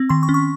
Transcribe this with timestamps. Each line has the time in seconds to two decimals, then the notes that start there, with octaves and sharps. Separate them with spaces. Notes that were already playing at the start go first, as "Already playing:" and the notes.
Already playing: C4
0.09 D#3 C6
0.23 C#6
0.29 C#4
0.34 C#6